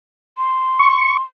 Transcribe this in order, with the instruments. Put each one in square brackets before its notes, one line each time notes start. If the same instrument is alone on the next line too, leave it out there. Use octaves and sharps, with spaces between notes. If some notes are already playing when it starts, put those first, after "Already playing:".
[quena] C6
[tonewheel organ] C#6